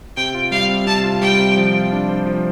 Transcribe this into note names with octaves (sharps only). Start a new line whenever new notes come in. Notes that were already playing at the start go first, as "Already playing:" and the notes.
C3 G5
F4
G3 F5
C3
C3 A5
F4
G3 G5
C3
F3
F4
D4
C5
F3